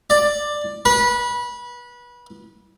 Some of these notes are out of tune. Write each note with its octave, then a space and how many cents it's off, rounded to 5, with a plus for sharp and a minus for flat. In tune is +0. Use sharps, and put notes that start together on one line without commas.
D5 +10
B4 -25